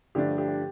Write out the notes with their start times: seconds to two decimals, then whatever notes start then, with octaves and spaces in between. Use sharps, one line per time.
0.15 G2 D3 F3 A3 D4 G4
0.38 G4
0.48 G4